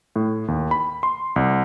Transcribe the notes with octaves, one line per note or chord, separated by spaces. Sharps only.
A2
D#2
B5
C6
C2